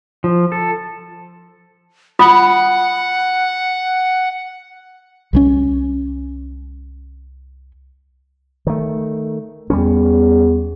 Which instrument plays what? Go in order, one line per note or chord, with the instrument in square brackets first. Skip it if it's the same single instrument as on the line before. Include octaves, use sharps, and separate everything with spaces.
[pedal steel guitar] F3
A4
[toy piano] F4 B5 D#6 [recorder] F#5
[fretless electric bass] C2 E3 C#4
[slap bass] D#3 A3
[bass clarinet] E2 [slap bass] G3 A3 C#4